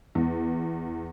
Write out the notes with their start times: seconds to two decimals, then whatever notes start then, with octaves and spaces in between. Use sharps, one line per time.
0.15 E2